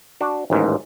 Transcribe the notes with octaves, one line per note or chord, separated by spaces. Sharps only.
D4 F#4
A1 D#2 G#2